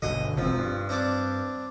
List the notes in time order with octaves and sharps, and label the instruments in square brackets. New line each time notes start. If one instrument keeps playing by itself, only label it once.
[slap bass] G1 B2 D3 [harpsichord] D#5
[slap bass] E1 C4 [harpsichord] F3
[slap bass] G2
[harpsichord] C4 D4 D6